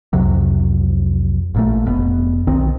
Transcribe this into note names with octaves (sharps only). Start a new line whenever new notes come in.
C2 F2 C3 F#3
A1 A#2 A3
F1 B2
B1 D#3 C4